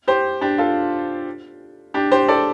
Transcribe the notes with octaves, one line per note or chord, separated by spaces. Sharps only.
G4 C5
D4 G4
F4 A4
D4 G4
G4 C5
A4 D5